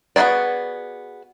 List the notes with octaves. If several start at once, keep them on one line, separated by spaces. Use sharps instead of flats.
B3 F#4 G#4 C#5 D5